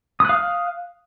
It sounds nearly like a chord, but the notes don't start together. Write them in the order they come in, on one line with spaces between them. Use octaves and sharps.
D#6 F#6 F5 F6